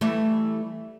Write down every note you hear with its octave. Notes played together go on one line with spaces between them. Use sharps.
E3 G3 A3